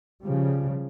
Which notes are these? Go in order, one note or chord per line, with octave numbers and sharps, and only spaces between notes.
C#3 F3 G3